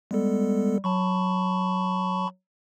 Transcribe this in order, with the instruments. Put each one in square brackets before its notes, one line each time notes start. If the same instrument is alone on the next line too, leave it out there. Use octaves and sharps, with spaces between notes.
[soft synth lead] G3 [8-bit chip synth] G#3 B3 A4
[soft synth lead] F#3 [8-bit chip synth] A5 B5 C#6